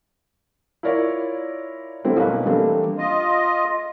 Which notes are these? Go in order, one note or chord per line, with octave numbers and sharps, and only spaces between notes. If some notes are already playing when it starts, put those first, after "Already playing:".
E4 F4 A#4 C#5 D5
D3 G3 A3 C4 E4 C5
B1 A#3 C#4 B4
E3 G3 A3 A#3 C4 D4
F4 D#5